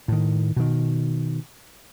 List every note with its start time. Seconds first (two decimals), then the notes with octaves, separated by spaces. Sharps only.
0.08 A2 D#3
0.56 B2 D#3